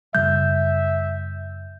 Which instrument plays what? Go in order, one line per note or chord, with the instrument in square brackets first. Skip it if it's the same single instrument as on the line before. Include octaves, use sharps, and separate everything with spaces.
[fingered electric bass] F#2 C#3 G3 [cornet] E5 [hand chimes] G6